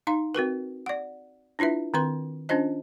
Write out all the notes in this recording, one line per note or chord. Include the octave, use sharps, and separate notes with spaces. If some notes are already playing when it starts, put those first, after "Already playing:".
D#4 F5 C6
C4 F#4 A#4 B4
D5 F#5
D4 E4 F4 B4 E5
D#3 C4 B4 C6
C#4 D4 F4 C5 D#5